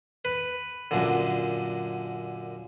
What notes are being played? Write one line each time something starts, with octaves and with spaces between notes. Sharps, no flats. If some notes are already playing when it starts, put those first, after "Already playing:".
B4
F#2 A#2 D3